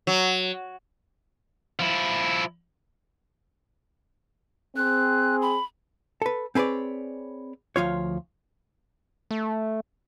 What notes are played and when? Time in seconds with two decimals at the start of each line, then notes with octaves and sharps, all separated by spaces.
0.07 F#3
1.79 F3 E4
4.76 C4 G#4 F#6
5.42 B5
6.22 A4 B4
6.55 C4 G#4 B4 C#5 D5
7.76 D2 F3 F4 C#5
9.31 A3